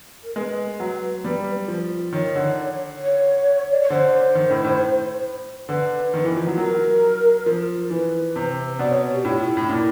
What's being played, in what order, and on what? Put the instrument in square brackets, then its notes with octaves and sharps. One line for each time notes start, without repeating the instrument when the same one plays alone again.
[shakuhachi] A#4
[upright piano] G#3 [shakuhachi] B4
[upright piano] F#3
G3
F3
[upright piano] D#3 [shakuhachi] C#5
[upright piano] D3
[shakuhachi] C#5
D5
C#5
[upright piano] D3 [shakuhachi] C5
[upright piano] D#3
A2
A2
[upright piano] D3 [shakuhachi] B4
[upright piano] D#3
E3
F3
F#3
[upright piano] F#3 [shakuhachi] A#4
[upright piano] F3
[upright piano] E3 [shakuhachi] B4
[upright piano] C3
[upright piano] B2 [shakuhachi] D5
[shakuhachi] C#5
G4
[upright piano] A2 [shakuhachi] F4
[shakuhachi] E4
[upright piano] A2
A#2